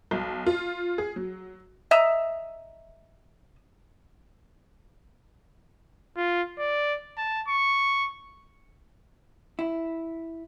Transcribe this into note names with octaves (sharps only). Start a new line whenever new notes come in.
B1
F4
G#4
F#3
D#5 E5 A#5
F4
D5
A5
C#6
E4